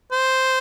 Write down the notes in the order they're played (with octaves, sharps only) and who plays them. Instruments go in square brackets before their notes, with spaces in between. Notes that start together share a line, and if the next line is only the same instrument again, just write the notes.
[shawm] C5